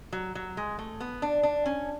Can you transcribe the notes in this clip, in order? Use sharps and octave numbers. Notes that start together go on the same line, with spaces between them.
F#3
F#3
G#3
A3
B3
D4
D4
C#4